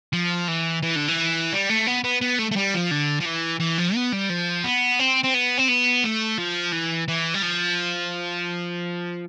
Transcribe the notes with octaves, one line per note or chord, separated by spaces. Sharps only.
F3
E3
E3
D3
E3
G3
A3
B3
B3
B3
A3
A3
G3
F3
D3
F3
E3
E3
F3
B3
G3
F3
B3
C4
C4
B3
C4
B3
A3
F3
E3
E3
G3
F3